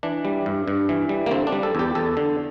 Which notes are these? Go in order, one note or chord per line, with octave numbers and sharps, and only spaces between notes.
E3 D4
G3
G2
G2
E3
G3
A#3
D3 C4
D4
G3
A4
E2 G4
E2 A4
D3